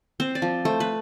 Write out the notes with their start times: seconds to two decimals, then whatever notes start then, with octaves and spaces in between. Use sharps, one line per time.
0.20 C4 C5
0.35 D5
0.42 F3
0.65 A3 C5
0.80 B4